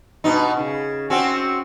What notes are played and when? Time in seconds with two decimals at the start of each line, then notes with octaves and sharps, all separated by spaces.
0.24 G2 B2 D#4
0.57 C#3
1.10 C4 C#4 F#4